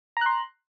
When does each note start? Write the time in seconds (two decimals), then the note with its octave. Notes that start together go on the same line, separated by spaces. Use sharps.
0.17 A#5
0.21 F#6
0.26 C6